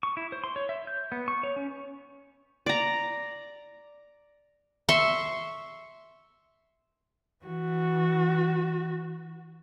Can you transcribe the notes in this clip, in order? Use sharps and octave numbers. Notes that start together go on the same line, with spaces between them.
C#6
E4
C5
C6
C#5
E5
G6
B3
C#6
C#5
C#4
D5 A#5
E5 C6 C#6
E3 F#4